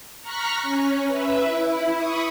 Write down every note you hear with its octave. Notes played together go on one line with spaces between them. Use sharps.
A#5 C#6 F6 F#6 A#6 B6
C#4
B4 E5
E4
B5 C#6 D#6